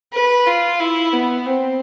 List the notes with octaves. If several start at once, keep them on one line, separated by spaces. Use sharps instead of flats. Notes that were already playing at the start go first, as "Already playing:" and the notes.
B4
F4
E4
B3
C4